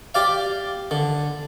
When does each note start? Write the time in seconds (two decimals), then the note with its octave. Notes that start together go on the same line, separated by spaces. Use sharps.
0.15 G4 D5 F5
0.91 D3